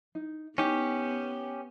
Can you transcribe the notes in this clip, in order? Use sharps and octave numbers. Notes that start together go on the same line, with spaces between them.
D#4
B3 C#4 D#4 G4